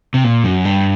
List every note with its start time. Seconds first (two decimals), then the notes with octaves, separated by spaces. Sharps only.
0.14 C3
0.24 A#2
0.44 F#2
0.65 G2